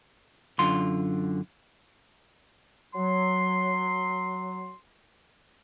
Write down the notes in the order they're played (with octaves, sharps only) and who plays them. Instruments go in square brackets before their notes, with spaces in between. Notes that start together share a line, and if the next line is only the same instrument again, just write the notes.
[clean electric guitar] F#2 D3 F4 C6
[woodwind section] F#3 [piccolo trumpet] C6